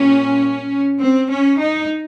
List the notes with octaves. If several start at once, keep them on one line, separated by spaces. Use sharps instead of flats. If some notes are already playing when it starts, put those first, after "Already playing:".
Already playing: A#2 G3 C#4
C4
C#4
D#4